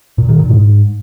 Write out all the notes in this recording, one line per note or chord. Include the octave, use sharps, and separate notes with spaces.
A#2
D#3
A#2
G#2